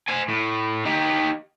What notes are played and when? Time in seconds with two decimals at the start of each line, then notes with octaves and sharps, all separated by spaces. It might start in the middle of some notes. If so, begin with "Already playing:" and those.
0.08 C5 G#5
0.28 A2
0.86 D#4 G4